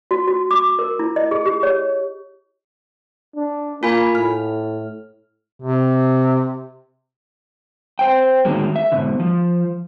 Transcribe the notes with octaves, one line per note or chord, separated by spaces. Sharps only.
F#4
F#4
D6
A#4
E4
D#5
G#4
G4
C#5
D4
A#3 F4 G#5 B5
A2 F6
C3
C5 G5
A2 D3 D#3 F#3 G#3 A#3
E5
G#2 B2 D3
F3